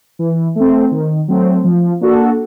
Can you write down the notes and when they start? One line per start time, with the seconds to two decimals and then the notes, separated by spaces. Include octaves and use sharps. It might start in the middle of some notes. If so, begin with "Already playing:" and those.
0.19 E3
0.55 A3 C4
0.92 D#3
1.28 F#3 A3 C4
1.64 F3
2.01 A#3 D4 F#4 A4